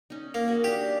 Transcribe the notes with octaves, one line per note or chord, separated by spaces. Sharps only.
C#4 D#4
A#3
F#4 G#4
D4 G4 D5